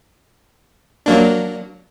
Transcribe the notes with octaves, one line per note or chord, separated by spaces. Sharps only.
F#3 A#3 D4